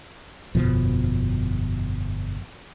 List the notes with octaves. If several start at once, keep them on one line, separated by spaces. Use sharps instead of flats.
G1 F2 B2 F3